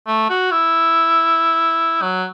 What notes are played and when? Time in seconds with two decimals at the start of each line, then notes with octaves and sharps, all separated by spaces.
0.07 A3
0.30 F#4
0.51 E4
2.02 F#3